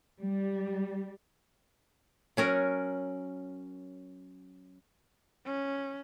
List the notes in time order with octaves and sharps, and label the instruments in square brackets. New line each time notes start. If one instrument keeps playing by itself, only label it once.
[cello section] G3
[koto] F#3 C#4 A#4
[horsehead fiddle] C#4